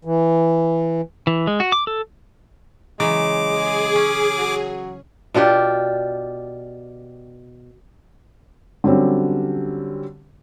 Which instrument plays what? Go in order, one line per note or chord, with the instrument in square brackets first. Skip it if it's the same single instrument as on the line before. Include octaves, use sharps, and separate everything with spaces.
[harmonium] E3
[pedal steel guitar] E3
G#3
F#4
D6
A4
[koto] C#3 E3 F#3 [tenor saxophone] G#3 [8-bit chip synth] D6
[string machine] G#4
[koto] C#4
[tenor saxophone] F#3
[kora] B2 D4 F4 G4
[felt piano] D3 F#3 G3 C4 C#4